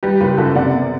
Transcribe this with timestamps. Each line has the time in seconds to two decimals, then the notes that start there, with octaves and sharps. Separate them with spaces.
0.03 G3 G4 B4
0.20 F#1 G4 B4
0.38 F#2 F#4 A4
0.56 C3 D5 F#5
0.73 B3